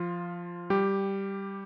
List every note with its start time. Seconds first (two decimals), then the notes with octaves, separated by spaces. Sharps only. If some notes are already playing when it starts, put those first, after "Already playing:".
Already playing: F3 F4
0.70 G3 G4